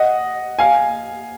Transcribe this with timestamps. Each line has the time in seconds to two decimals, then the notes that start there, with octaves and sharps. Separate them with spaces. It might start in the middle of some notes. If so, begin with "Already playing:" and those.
Already playing: D#5 F#5
0.59 F5 G#5